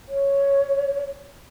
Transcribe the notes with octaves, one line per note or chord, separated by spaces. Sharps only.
C#5